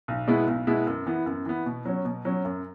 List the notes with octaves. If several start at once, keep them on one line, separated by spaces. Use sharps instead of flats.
B1
B2 G#3 B3 E4
B1
B2 G#3 B3 E4
F#2
E3 B3
F#2
E3 B3
B2
F#3 C#4
B2
F#3 C#4
F#2